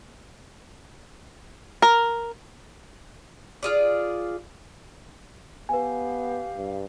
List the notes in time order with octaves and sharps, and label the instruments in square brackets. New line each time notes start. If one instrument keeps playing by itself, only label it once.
[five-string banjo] A#4
[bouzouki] F4 G#4 D5
[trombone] B3 [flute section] G4 F5 [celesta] B4 G#5
[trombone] G2